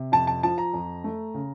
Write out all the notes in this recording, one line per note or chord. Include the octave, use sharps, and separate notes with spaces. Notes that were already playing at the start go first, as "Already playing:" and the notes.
Already playing: C3
F2 A5
A5
F3 A5
A#5
F2
A3
C#3